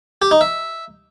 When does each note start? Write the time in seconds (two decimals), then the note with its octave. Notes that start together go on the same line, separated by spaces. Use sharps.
0.22 G4
0.31 D#4
0.41 E5